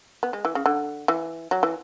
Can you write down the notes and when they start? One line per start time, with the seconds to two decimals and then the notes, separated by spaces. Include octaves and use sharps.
0.23 B3
0.33 G#3
0.45 E3
0.55 C#3
0.66 D3
1.08 E3
1.51 F#3
1.63 E3